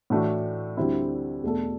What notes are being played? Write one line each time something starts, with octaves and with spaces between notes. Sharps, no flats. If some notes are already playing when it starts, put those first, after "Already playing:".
A2 E3 A3 D4 F#4
D2 D3 G3 C4 E4
E2 B2 A3 D4 A4